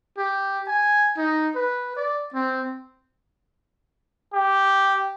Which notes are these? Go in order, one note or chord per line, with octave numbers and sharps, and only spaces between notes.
G4
G#5
D#4
B4
D5
C4
G4